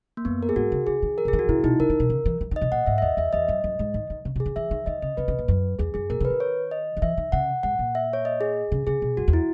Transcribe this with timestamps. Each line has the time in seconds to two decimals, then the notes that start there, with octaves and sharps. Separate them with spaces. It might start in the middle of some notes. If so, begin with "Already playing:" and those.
0.17 A#3
0.25 F#2 B3
0.43 A#4
0.49 G#4
0.56 G#2 F#4
0.72 C#3
0.87 C#3 G#4
1.02 D#3
1.18 A#4
1.25 C#3
1.28 G#4
1.33 D#3
1.39 F#4
1.49 C#3 E4
1.64 B2 D#4
1.79 C#3 A#4
1.90 D#3
2.00 B2
2.10 C#3
2.26 E3
2.41 E3
2.51 D#3 D#5
2.61 B2
2.72 A#2 F#5
2.86 G#2 E5
2.98 E5
3.02 E2 D#5
3.17 E2 E5
3.33 E2 D#5
3.48 F#2
3.64 F#2
3.79 G#2
3.94 D#3
4.10 D#3
4.25 C#3
4.36 B2 G#4
4.46 C#3
4.56 E3 E5
4.71 D#3
4.86 D#3 D#5
5.02 C#3 D#5
5.17 C#3 B4
5.28 C#3
5.39 A#2
5.48 F#2
5.79 E2 G#4
5.94 F#2 G#4
6.10 A#2 A#4
6.20 C#3 B4
6.30 D#3
6.40 C#5
6.71 D#5
6.97 D#3
7.02 E3 E5
7.17 D#3
7.32 C#3 F#5
7.63 G#2 F#5
7.79 A#2
7.95 E5
8.13 C#5
8.25 D#5
8.41 G#4
8.72 C#3
8.87 C#3 G#4
9.02 B2
9.17 F#2 F#4
9.28 E2
9.33 E4